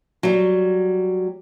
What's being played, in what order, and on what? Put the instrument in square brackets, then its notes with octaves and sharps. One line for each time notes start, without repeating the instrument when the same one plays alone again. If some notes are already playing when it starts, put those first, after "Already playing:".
[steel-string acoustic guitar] F#3 G3